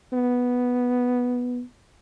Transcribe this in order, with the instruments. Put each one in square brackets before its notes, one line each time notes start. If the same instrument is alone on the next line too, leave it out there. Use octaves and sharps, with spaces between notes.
[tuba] B3